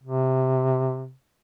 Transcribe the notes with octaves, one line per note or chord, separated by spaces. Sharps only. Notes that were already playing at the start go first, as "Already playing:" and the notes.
C3